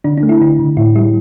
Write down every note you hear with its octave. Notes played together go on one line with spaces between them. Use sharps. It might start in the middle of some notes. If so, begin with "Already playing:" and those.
D3 D4
D4
A3
E4
D3 D4
D3
A2 E4
G3 E4